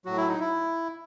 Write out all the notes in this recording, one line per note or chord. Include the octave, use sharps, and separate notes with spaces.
A2 F#3 F#4
E4
D#4
E4